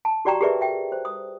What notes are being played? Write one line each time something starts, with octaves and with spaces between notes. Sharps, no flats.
A5
F#4 G4 D5 G5 A#5 C#6
G4 G#4 A#4 B4 D5 E5
E5 G5
C5
D#6